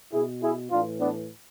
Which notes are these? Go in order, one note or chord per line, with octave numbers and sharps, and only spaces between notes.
B2 E4 G#4
E4 G#4
A2 E3 D4 F4
B3 D4